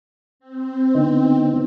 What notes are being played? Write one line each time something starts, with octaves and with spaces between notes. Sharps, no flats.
C4
D3 B3 D#4